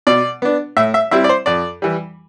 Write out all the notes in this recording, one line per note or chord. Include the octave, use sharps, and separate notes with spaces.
B2 D5
B3 D4
A2 E5
E5
G3 C4 E4 E5
D5
C5
F2 D5
E3 G3